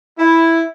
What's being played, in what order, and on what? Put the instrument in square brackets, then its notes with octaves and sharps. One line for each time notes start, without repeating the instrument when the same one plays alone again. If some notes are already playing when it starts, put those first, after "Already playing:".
[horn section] E4